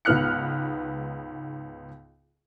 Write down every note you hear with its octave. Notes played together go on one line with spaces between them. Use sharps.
C#2 G#2 B3 F6 F#6 C#7